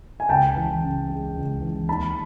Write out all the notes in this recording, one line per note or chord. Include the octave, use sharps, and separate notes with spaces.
G#5
C#2 G5 A5
E3
C#3
G#3
C#2
E3
D#2 A5 B5